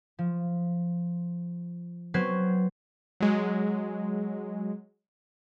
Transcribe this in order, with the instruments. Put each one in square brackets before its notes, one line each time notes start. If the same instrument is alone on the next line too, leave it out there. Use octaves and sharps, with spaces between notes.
[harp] F3
F#3 B3 C4 B4 C5 G#6
[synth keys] F#3 G#3